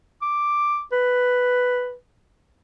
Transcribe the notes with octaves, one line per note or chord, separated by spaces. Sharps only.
D6
B4